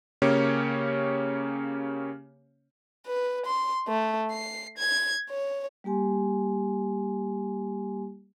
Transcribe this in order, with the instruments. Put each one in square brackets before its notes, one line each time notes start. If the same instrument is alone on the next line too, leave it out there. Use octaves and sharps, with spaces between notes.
[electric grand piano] C#3 A#3 C#4 G4 C#5
[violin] B4
C6
A3
C7
G#6
C#5
[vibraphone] G3 A#3 G4 G#5 C6